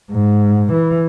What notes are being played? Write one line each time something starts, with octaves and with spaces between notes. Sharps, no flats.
G#2
E3